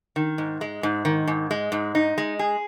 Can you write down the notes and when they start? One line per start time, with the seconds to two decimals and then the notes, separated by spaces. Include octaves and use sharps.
0.16 D#3
0.38 G#2
0.61 G#3
0.83 G#2
1.05 D#3
1.27 G#2
1.51 G#3
1.72 G#2
1.95 D#4
2.18 G#3
2.39 G#4